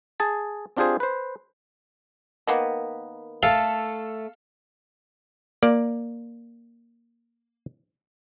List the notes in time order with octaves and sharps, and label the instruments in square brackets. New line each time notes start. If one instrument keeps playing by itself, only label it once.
[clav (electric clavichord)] G#4 A5
C4 D4 F4 G4 G#4 C5
B4 C5
[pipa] D#3 A#3 B3
[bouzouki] A3 A5 [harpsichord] A4 F5
[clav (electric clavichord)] A#3 D5